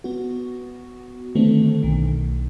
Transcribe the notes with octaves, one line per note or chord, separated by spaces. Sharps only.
B3 F#4
D3 D#3 A3 B3 C4 D4
B1 D#3